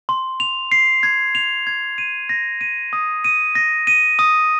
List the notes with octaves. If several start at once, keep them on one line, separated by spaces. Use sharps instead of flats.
C6
F7
C7
G#6
F7
G#6
D#7
A#6
D#7
D#6
D#7
A#6
D#7
D#6